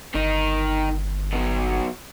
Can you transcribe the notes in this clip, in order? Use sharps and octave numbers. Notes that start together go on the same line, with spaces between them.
G1 D#3 D#4
B2 F#3